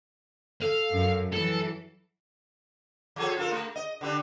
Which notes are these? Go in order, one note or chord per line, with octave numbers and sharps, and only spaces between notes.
A4 F5
F#2
E3 F#3 A4
F3 G#4 A4
F4 A4 A#4
A3
D#5
D3 G3 D4